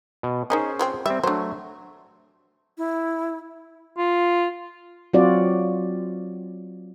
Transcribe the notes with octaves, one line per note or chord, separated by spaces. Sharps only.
B2
C#4 D#4 G#4 A#4 C5 D#5
F3 G#3 C4
G3 C4 E5
F#3 A3 D4 C5
E4
F4
F#3 C4 F4 F#4 D5